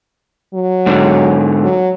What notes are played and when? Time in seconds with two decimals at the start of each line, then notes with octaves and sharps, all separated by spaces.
0.54 F#3
0.86 G#2 D3
1.64 F#3